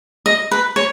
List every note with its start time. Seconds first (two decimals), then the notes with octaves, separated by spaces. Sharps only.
0.26 D#5
0.51 B4
0.76 C#5